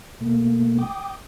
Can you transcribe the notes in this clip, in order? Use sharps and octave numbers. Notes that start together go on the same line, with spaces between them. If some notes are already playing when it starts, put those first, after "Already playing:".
B2 A3 A#3
G5 D6 D#6 G6